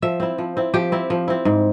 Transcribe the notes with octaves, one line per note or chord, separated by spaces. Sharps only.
F3 E5
C4 E4
F3
C4 E4
F3 G4
C4 E4
F3
C4 E4
G#2